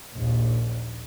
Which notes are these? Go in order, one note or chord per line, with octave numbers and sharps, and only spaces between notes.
A#1 D#2